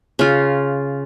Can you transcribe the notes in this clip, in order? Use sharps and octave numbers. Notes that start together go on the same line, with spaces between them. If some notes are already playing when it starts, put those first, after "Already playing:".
C#3 F4